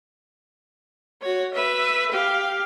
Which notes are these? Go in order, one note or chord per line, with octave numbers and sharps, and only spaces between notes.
F#4 C#5
B4 E5
G4 F5